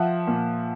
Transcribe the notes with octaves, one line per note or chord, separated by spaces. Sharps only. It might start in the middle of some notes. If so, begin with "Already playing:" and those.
Already playing: F3 E5 F#5
A#2